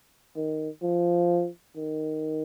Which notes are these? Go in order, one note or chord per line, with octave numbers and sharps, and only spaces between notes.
D#3
F3
D#3